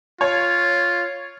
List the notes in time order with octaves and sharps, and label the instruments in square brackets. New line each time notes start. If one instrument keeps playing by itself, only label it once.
[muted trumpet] F4 [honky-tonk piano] C#5